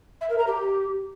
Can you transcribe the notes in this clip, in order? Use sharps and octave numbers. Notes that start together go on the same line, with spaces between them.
E5
A#4
A#5
G4